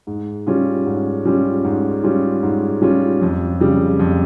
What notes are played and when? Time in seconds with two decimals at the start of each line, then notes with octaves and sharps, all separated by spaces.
0.07 G#2
0.47 G3 C#4 F4
0.86 G#2
1.25 G3 C#4 F4
1.64 G#2
2.03 G3 C#4 F4
2.43 G#2
2.82 G3 C#4 F4
3.22 F2
3.60 C#3 G3
3.99 F2